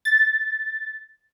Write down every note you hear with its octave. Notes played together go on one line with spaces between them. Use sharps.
A6